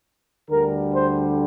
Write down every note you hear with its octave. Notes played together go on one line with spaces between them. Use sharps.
D2 D3 G3 A#4
C5